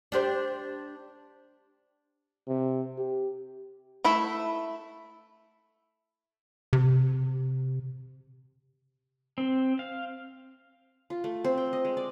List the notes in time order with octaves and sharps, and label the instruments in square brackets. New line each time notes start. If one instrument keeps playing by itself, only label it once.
[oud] D4 G4 C5
[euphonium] C3
G4
[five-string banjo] A3 E4 E5
[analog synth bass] C3
[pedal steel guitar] C4
F5
[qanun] F4
A3
C4
G5
D#5
G#3
D5